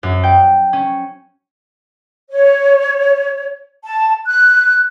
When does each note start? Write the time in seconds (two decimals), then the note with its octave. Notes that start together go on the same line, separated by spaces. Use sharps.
0.03 F#2
0.24 G5
0.73 C#4
2.30 C#5
3.83 A5
4.27 F#6